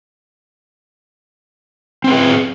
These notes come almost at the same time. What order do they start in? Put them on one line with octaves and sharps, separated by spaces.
C4 B4 G#4